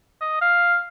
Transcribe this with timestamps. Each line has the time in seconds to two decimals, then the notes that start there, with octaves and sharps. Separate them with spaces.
0.21 D#5
0.41 F5